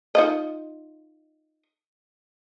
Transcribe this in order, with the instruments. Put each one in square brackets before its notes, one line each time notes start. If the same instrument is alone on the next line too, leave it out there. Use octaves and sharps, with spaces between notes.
[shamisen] D#4 F4 D#5